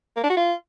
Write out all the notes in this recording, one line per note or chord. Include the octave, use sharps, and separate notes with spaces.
A#3
D4
F#4
F4